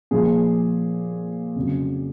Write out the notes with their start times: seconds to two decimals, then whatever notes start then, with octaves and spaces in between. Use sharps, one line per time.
0.11 A#2 F3 G#4
1.55 F2 C#3 F#3